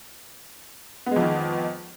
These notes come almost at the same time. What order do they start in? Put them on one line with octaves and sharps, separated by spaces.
B3 G#3 F2 D#3